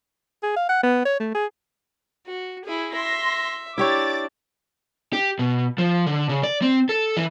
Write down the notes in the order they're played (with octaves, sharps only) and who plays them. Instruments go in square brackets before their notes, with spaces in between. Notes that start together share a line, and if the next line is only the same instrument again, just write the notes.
[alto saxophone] G#4
F5
F#5
B3
C#5
A3
G#4
[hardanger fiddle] F#4
E4 G#4
[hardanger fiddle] E5 [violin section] C6 A#6
[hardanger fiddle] D4 [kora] E4 G4 C#5 [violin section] D6 A6
[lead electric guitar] G4
B2
F3
D3
C#3
D5
C4
A4
E3